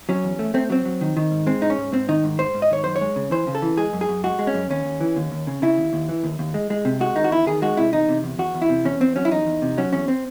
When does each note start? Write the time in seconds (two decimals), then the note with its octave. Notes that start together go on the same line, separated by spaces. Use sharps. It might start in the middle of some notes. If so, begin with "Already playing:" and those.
0.09 F#3 C#4
0.24 E2
0.39 A3
0.54 A3 C4
0.70 F#3 C4
0.85 F#3
1.01 D#3
1.17 D#3
1.32 G#2
1.47 G#3 C4
1.62 G#2 D#4
1.70 C#4
1.78 G#2
1.93 G#2 C4
2.09 D#3 D#4
2.24 G#2
2.39 G#2 C5
2.54 G#2
2.62 D#5
2.71 D#3 C#5
2.84 F#2 C5
2.96 C#5
3.01 G#3
3.16 C#3
3.31 E3 C5
3.47 C#3
3.55 A4
3.62 E3
3.77 G#3 G#4
3.93 F#2
4.01 G#4
4.09 F#2
4.24 G#3 F#4
4.39 G#3
4.47 C#4
4.54 F#2
4.70 D#2 C#4
4.85 D#2
5.00 E3
5.16 D#2
5.32 D#2
5.47 C#3
5.62 C#3 E4
5.77 D#2
5.93 D#2
6.09 E3
6.24 D#2
6.39 D#2
6.54 G#3
6.70 G#3
6.85 C3
7.00 G#3 F#4
7.16 D#3 D#4
7.24 F#4
7.32 E2 E4
7.46 D#3 G#4
7.62 G#3 F#4
7.77 C3 E4
7.93 E2 D#4
8.09 C3
8.24 E2
8.38 E2 F#4
8.54 E2
8.62 E4
8.69 C3
8.85 E2 C#4
9.00 E2 C4
9.16 F#3 C#4
9.25 E4
9.31 E2 D#4
9.47 E2
9.62 C3
9.78 F#3 C#4
9.93 E2 C#4
10.08 C4